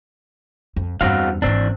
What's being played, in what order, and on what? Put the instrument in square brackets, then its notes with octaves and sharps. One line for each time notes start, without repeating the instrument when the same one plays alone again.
[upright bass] F2
[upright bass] E2 G2 [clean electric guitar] C4 F#4 F5
[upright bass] G#1 E3 [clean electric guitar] C4 D4